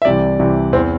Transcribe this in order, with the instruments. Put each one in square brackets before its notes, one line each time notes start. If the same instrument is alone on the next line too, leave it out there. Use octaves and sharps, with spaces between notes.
[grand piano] E5
C2 C3 E3 D5
C2 C3 E3
E2 E3 C4